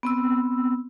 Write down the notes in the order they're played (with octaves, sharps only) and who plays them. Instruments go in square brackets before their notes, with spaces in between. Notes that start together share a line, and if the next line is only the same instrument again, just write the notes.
[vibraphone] B3 C4 E6